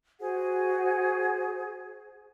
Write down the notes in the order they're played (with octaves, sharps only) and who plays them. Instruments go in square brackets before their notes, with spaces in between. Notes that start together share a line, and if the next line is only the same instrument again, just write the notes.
[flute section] F#4 G#4 C5 F#5